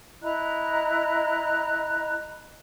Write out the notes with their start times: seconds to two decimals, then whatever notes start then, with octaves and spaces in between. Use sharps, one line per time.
0.22 E4 D#5 A#5 F#6